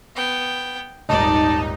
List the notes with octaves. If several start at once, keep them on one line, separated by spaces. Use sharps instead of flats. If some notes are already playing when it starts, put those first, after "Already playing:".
B3 G5
D#1 G#1 D#4 D5 A5